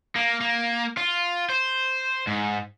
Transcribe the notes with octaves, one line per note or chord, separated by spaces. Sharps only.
A#3
A#3
F4
C5
G#2